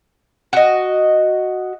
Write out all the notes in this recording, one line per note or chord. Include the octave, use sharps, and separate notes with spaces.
F#4 D#5